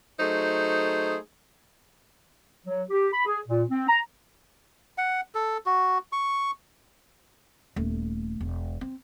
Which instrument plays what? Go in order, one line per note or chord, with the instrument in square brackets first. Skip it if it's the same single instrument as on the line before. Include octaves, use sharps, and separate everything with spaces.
[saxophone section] F#3 A3 D#4 G#4 C5
[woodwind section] F#3
G4
B5
G#4
A#2
C4
A#5
[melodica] F#5
A4
F#4
C#6
[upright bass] D#1 A3
E1
C4